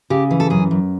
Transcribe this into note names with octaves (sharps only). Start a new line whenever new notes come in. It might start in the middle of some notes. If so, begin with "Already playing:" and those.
C#3 G4
E3
A4
F#2 G#4
F#2